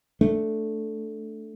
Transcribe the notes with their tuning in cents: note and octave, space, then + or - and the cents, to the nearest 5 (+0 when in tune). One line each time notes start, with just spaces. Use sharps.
A3 +0 D4 +0